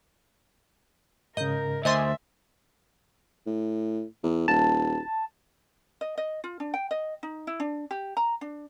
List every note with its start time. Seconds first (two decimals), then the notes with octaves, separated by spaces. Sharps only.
1.37 G#2 C#3 A#4 D#5 G6
1.85 D2 C5 D#5 E5 G#5 C6 A6
3.46 A2
4.23 E2
4.48 D#1 A5
6.01 D#5
6.18 D#5
6.44 F4
6.60 D4
6.74 G5
6.91 D#5
7.23 D#4
7.47 E4
7.60 D4
7.91 G4
8.17 A#5
8.41 D4